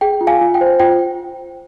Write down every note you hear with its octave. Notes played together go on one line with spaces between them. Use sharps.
G#4 G5
F4
F5 G#5
F4
G5
C5
F4 G5